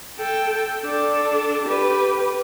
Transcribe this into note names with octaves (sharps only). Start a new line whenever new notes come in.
A4 G5
D4 A4
G4 B4